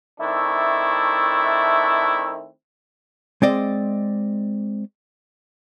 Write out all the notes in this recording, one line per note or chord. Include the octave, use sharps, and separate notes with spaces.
D#3 A3 C4 D4 E4
G#3 C4 D5 D#5